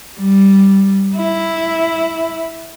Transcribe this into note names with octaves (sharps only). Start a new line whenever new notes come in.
G3
E4